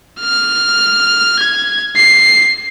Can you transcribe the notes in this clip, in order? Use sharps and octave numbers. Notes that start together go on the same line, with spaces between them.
F6
G#6
C7